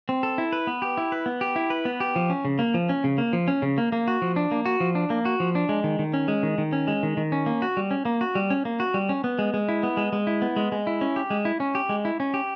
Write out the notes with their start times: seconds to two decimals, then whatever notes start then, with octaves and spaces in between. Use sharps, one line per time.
0.09 C4
0.23 A4
0.38 E4
0.53 B4
0.67 B3
0.82 G4
0.98 E4
1.12 B4
1.26 B3
1.41 G4
1.56 E4
1.70 B4
1.85 B3
2.00 G4
2.16 F3
2.30 C#4
2.45 C#3
2.59 A#3
2.74 F3
2.89 C#4
3.04 C#3
3.18 A#3
3.33 F3
3.48 C#4
3.62 C#3
3.78 A#3
3.92 A#3
4.08 F#4
4.22 F3
4.36 D4
4.51 A#3
4.66 F#4
4.80 F3
4.95 D4
5.10 A#3
5.25 F#4
5.40 F3
5.55 D4
5.69 G#3
5.84 D#3
5.99 D#3
6.14 C#4
6.28 G#3
6.43 D#3
6.58 D#3
6.73 C#4
6.88 G#3
7.03 D#3
7.17 D#3
7.32 C#4
7.46 A#3
7.62 F#4
7.77 G3
7.91 C#4
8.05 A#3
8.21 F#4
8.35 G3
8.50 C#4
8.65 A#3
8.80 F#4
8.94 G3
9.09 C#4
9.24 B3
9.39 G#3
9.54 G#3
9.69 E4
9.83 B3
9.97 G#3
10.13 G#3
10.27 E4
10.42 B3
10.56 G#3
10.72 G#3
10.87 E4
11.01 C#4
11.16 G4
11.30 G#3
11.45 E4
11.60 C#4
11.75 G4
11.89 G#3
12.05 E4
12.20 C#4
12.34 G4